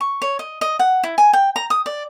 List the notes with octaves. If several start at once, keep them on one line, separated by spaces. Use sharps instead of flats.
C#6
C#5
D#5
D#5
F#5
E4
G#5
G5
A#5
D#6
D5